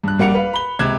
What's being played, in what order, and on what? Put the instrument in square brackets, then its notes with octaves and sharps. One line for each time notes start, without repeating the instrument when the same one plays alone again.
[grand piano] G2 F#6
A#1 G3 A#3 F#5 C#7 F7
B4 F5
B5 G7
C#2 C3 F#6 G#6 E7